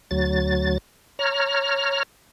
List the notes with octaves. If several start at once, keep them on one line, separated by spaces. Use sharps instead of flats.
D2 F#3 A6
C#5 A#5 F6